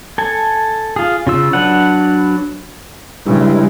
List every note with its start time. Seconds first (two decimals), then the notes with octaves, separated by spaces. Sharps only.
0.18 A4 G#5
0.96 F4 G#4
1.27 C#3 F4 E6
1.53 F#3 D4 B4 F#5
3.26 G2 C#3 G3 G#3 E4